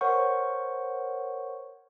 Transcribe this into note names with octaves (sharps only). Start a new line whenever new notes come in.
A#4 C5 C#5 F#5 C#6